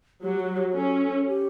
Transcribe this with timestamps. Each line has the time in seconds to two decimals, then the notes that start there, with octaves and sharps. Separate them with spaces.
0.22 F#3 G4
0.40 F#4
0.57 G4
0.69 G4
0.74 C#4 A4
1.27 G4